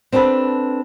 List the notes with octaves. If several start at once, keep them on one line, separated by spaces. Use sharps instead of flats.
C4 D4 G4 A4 B4